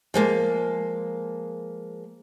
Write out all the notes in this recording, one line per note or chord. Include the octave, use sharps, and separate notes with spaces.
F3 G#3 A#3